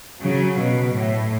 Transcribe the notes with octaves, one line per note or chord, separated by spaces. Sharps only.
C#3 F#3
B2
A2